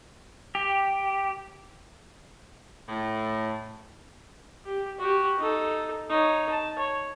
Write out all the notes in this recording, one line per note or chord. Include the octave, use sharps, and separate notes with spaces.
G4
A2
G4
F#4 G4
D#4 A4
D#4 C#5
A5
C#5